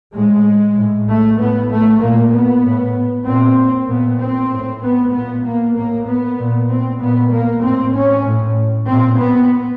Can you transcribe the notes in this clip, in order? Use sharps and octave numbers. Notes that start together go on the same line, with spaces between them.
A2 G#3
A2
A3
A2 B3
A3
A#2 A#3
B3
A2
A#2 C4
A#2 B3
C4
A2
B3
A#2 B3
A#3
A2 A#3
B3
A#2
C4
A#2 B3
A#3
A2 C4
C#4
A2
A#2 C4
B3